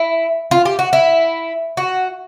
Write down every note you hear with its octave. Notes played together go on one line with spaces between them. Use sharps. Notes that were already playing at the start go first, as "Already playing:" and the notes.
Already playing: E4
F4
G4
F#4
E4
F#4